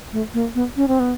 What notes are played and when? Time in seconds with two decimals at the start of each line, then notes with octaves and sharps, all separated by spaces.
0.13 A3
0.34 A#3
0.55 B3
0.76 C#4
0.88 C4
1.00 B3